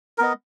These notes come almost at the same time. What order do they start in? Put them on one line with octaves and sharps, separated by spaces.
A#4 B3 D#5